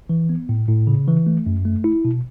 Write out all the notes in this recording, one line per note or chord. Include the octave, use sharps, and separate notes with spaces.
E3
B3
A2
A2
C#3
E3
A3
F#2
A3
E4
B2